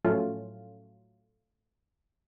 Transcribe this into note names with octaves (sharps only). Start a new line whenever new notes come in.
A2 F3 F#3 A3 C#4 F4